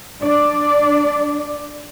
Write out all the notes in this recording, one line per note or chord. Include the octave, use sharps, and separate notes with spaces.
D4 D5